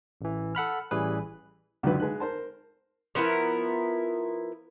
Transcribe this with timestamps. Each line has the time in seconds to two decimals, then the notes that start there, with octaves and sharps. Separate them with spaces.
0.21 A1 E3
0.55 A4 F#5 B5 F6
0.91 A1 E3 G3 G#4 B4
1.83 C#2 F#2 D3 F#3 B4
2.00 G#3 B4 F#6
2.20 A#4 C5 A5
3.15 F3 B3 E4 A#4